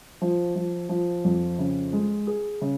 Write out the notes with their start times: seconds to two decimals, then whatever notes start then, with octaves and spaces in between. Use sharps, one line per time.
0.22 F3
0.55 F3
0.89 F3
1.25 F2
1.59 C#3
1.93 G#3
2.27 G#4
2.61 C#3